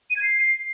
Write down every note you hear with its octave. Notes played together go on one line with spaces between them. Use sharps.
D#7
G#6
C7